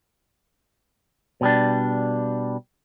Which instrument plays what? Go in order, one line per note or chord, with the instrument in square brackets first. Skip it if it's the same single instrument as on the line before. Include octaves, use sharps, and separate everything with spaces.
[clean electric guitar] B2 G3 D4